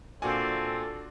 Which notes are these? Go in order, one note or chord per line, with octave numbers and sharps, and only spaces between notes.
A#2 C4 D4 F4 F#4 A4 G#5